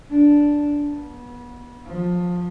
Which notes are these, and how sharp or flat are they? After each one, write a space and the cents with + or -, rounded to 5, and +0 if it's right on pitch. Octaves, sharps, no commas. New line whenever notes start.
D4 -5
B3 -25
F3 +20